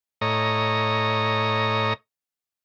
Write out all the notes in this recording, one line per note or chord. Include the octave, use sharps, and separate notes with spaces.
A2 C#5 D#5 A#5